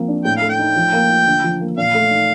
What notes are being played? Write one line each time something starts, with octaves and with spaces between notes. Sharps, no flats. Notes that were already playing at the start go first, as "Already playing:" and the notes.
Already playing: F3 A#3 C4
D4
A2 G5
F5
A3
G5
D#4
F3
A#3
F4
D3
F3
A#3
A#2 F5
A3
D#4